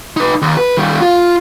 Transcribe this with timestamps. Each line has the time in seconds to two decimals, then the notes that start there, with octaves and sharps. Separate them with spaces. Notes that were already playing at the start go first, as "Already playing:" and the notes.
0.17 D#4 B4
0.42 D#2
0.57 B4
0.77 D#3 G3
1.01 F4